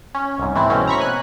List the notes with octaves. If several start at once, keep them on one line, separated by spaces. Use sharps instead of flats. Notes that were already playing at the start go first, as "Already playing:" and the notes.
C#4
C2 G#2
E3 A3 C4 E4
B2 C4 C#4
A#5 B5 C#6 B6
G#5 F#6